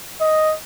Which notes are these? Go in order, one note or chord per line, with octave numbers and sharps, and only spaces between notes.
D#5